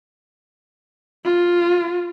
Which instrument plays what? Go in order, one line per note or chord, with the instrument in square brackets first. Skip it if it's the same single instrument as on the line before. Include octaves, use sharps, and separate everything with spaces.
[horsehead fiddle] F4